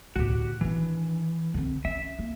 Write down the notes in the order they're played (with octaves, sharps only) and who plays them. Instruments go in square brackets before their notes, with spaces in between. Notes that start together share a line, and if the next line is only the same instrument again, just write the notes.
[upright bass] D2 A2 [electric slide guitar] F#4 G4
[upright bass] D#3 D4 [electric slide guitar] E3
[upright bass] D3 C4
[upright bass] C#4 [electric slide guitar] E5
[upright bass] A#3